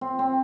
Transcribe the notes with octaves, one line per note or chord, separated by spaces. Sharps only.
C4
C4